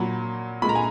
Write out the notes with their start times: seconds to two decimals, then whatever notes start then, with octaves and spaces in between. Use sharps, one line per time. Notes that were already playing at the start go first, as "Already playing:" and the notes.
Already playing: A#2 F#3 B5
0.62 A#2 G#3 B5
0.69 A#5
0.75 G#5